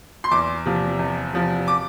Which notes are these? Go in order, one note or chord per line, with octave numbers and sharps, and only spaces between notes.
C6
E2 D6
C3 F3
E2
C3 F3
D6